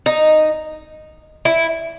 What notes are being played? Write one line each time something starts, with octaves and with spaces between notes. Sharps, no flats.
D#4
E4